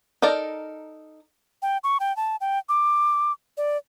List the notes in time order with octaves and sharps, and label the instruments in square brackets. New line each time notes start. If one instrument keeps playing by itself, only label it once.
[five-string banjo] D#4 A4 A#4 D5
[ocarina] G5
C#6
G5
A5
G5
D6
D5